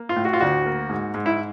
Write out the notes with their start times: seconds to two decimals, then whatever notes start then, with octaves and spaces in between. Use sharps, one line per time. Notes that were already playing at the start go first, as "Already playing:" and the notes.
Already playing: A#3
0.09 F4
0.16 A2
0.25 F#4
0.33 F4
0.40 D2 F#4
0.66 A#3
0.90 G#2
1.14 G#2
1.26 E4